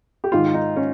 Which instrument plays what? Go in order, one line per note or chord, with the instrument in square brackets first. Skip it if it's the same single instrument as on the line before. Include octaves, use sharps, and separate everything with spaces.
[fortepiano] G4
G#2 D#3 F4
D#4
C#4